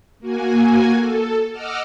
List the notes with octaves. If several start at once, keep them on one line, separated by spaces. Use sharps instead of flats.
A#3 F#4 G#5
A4
D#5 F#5 D6 E6 F6